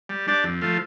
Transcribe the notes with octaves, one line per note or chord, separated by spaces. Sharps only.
G3
D4 G4 D5
F2
F3 A3 F4